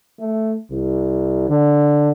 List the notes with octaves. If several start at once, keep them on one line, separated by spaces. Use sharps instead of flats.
A3
C2
D3